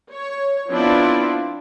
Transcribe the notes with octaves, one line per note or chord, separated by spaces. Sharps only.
C#5
F3 B3 C4 D4 E4 F4